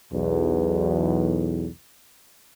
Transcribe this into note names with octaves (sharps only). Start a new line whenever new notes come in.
B1 E2